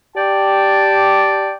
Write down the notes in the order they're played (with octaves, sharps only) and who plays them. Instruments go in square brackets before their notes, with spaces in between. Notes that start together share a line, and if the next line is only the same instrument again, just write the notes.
[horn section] G4 D5 G5 A5